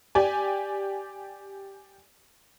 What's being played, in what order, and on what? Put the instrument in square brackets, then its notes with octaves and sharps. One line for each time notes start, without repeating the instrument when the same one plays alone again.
[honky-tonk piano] G4 D5 G#5